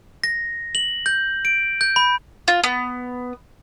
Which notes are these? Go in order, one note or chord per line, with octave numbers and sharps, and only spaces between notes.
A#6
F#7
G6
D7
G6
B5
F4
B3